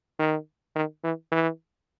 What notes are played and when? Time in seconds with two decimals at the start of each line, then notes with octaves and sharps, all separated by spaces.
0.19 D#3
0.76 D#3
1.04 E3
1.32 E3